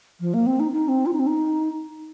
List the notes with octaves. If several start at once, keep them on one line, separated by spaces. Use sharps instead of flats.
F3
A#3
C4
D#4
D#4
C4
F4
D#4
C4
D#4